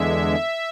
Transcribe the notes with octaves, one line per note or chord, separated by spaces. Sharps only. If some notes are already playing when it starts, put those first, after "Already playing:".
Already playing: E2 D3 G#3 E5